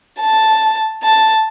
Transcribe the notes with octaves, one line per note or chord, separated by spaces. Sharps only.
A5
A5